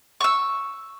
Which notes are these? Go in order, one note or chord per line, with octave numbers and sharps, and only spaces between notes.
C#6 E6